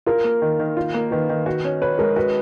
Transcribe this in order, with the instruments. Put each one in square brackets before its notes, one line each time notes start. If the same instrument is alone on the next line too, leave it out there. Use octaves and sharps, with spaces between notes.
[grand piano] F4 [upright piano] A#4
[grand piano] A#3
D#3
D#3
F4
A#3
[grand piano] D#3 [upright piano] B4
[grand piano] D#3
F#4
C#4
[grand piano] B4 [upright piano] C#5
[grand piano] G#3 [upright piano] A#4
[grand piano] F#4 [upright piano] B4